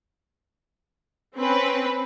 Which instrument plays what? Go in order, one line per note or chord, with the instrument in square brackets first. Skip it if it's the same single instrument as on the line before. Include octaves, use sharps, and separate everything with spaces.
[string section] C4 C#4 B4